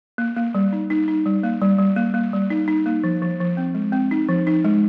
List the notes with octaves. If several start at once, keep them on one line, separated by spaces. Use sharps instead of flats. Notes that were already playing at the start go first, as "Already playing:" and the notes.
A#3
A#3
G3
D#4
D#4
D#4
G3
A#3
G3
G3
A#3
A#3
G3
D#4
D#4
A#3
F3
F3
F3
C4
G#3
C4
D#4
F3
D#4
G#3